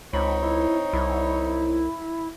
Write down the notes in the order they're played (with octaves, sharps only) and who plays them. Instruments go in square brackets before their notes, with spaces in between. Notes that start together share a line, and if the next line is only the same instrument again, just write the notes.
[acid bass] C#2 [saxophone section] C4 D#4 C#5 [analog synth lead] B5
[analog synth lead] E4
[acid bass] C2 [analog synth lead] E4